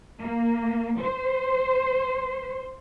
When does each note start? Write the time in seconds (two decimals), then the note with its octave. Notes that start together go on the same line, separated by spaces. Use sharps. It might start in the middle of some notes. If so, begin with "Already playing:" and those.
0.21 A#3
1.01 C5